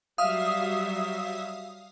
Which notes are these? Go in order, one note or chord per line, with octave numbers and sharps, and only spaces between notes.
F#3 G3 E5 F5 D#6